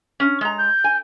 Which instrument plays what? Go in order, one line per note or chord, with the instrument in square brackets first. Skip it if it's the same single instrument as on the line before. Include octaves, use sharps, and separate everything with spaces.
[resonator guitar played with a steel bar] C#4
G#3 A#5
[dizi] G6
[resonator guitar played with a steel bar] G#5